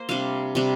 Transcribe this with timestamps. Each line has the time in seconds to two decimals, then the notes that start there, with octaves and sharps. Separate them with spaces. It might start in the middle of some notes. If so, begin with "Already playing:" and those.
Already playing: A#3 C5
0.09 C3 G3 D4 F5
0.55 C3 G3 D4